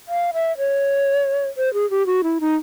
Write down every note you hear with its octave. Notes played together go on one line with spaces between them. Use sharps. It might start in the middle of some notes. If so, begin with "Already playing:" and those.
F5
E5
C#5
C5
G#4
G4
F#4
E4
D#4